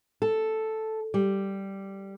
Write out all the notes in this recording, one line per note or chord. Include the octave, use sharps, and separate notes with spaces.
A4
G3